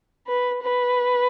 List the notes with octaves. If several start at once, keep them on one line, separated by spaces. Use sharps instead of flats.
B4
B4